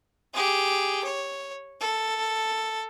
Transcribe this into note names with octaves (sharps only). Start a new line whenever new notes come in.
G4 G#4
C#5
A4